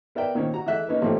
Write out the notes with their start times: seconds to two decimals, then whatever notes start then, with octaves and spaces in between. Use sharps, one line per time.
0.15 B3 A#4 D5 E5 G5
0.35 A#2 D#3 C4 C#4
0.54 F#4 A#5
0.66 E3 G#3 A4 E5 F#6
0.88 A#3 C#4 D#4 B4
1.02 A1 A#2 A3 C4 C#4 G4